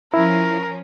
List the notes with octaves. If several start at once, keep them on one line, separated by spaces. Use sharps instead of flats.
F3 C#4 E4 A#4